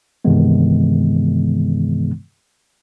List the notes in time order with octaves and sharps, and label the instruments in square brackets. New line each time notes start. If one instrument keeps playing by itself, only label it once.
[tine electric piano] G2 C3 D#3 E3 G#3 B3